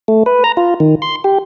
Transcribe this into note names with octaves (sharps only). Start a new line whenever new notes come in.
A3
B4
A#5
F4
D#3
C6
G4